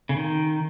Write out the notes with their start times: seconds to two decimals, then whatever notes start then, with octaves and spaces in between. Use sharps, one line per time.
0.09 C#3
0.16 D#3